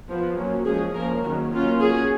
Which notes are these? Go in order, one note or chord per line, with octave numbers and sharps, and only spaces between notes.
F3 B3
F#3 A#3 C#4
F3 G#3 C#4 G#4
F3 A#3 C#4 A#4
D#3 F#3 A#3 C#4 F#4
F#3 A#3 C#4 F4
F#3 C#4 G#4